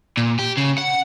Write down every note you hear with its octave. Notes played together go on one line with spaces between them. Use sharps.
A#2
G4
C#3
F#5